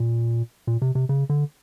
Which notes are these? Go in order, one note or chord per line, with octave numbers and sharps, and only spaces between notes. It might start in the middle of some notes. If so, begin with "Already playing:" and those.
Already playing: A#2
A#2
C3
C3
C#3
D3